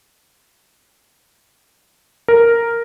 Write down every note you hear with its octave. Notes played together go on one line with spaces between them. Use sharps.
A#4